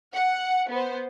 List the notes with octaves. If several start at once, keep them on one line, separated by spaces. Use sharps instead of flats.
F#5
B3 C5